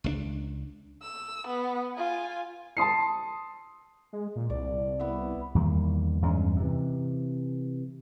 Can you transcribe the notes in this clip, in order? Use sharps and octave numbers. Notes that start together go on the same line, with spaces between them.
C#2 A3 D4
E6
B3
F4 G#5
A5 C6 D#6 C7
G#3
A#2
C2 D5
B3 E4 E5
E2 D#3 G3 A#3
E2 G2 G#3 C#4
C3 E3